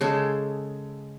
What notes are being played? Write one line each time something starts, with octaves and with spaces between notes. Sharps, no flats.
C#3 G#3 A4